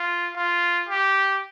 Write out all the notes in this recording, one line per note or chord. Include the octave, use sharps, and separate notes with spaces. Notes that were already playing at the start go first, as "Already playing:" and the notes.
Already playing: F4
F4
G4